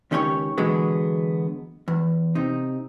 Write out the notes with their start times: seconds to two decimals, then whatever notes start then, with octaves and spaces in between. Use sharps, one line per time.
0.11 C#2 D#3 C#4 G4 A#4 C#5
0.58 B2 D3 E3 F#3 G#3 B3
1.88 E2
2.35 C3 D#4